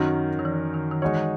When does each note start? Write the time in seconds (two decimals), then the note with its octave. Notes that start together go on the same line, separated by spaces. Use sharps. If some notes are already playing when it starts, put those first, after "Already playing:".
Already playing: F#2 D#3 F#3 C#4
0.39 D#3
0.45 E3
0.74 D#3
0.91 D#3
1.02 E3 G#3 D#4 F#4 C#5